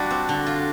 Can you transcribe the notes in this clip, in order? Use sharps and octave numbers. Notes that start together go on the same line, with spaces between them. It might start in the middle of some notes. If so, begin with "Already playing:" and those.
Already playing: G3 D4 F4 F#4
C4
D3
F4